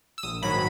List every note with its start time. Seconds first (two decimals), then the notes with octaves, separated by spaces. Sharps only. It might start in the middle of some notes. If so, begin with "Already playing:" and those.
0.18 E6
0.23 A#1 D#6
0.42 G#2 D#3 F#3 B5